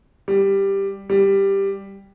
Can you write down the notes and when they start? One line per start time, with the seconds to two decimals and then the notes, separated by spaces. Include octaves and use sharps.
0.28 G3
1.10 G3